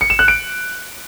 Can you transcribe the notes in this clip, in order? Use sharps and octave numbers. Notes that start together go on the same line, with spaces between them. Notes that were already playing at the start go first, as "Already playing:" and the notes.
C#7
E7
F#6
D7